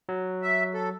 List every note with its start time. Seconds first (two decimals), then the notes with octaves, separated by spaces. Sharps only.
0.09 F#3
0.42 E5
0.74 A4